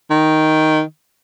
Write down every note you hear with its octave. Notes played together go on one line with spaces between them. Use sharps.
D#3